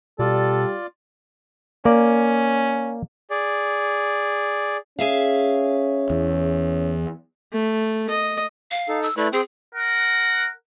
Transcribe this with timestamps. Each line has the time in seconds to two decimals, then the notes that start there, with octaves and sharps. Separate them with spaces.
0.19 B2 G3 F4 A4 D5
1.85 A#3 C#4 D5
3.31 G#4 D5
4.99 C#4 G#4 E5 F5
6.10 E2
7.52 A3
8.10 D#5
8.71 F5
8.89 D#4 A4
9.03 E6
9.17 A3 E4 B4 D5
9.33 C4 G#4 G5
9.75 A#4 F#5